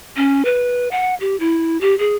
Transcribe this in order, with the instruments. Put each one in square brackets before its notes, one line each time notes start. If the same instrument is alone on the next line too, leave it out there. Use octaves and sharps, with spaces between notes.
[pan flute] C#4
B4
F#5
G4
E4
G4
G#4